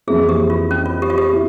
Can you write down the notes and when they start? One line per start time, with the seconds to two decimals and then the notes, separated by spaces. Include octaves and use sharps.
0.07 F2 E3 A#3 E4 G#4
0.29 G4
0.50 F4
0.71 C#4
0.86 F4
1.02 G4
1.10 F4
1.18 G4
1.33 E4